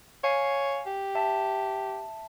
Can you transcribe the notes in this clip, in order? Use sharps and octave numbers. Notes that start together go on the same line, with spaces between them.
C#5 F5 G#5 C7
G4
E5 A5